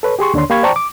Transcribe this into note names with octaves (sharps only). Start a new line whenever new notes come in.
A4 B4 C#5
G4 G#4 C6 C#6
D#2 D3 D4 C#5 C6
A#3 G4 F5 B5 C#6 G#6
C5 D5 G5 A5 A#5 C#6
D6